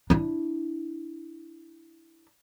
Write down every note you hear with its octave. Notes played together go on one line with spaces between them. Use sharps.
D4 E4